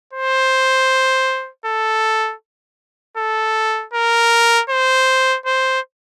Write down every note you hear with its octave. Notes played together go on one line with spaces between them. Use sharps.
C5
A4
A4
A#4
C5
C5